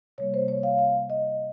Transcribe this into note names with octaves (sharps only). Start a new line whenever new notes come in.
C3 G3 A#3 C#5
C5
C#5
F5
F5
D#5